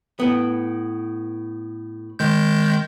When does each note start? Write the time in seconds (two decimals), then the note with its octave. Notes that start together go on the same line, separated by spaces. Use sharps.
0.20 A2 B3
2.19 D#3 G#3 G6